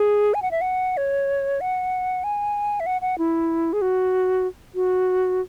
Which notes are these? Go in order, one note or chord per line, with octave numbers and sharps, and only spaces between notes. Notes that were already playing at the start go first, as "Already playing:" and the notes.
Already playing: G#4
G#5
F#5
E5
F#5
C#5
F#5
G#5
E5
F#5
F#5
E4
G#4
F#4
F#4